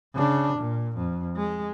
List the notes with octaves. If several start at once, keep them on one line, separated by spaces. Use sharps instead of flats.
C#3 D4
A#2
F2
G#3